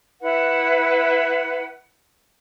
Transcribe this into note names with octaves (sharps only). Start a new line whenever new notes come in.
E4 B4 F#5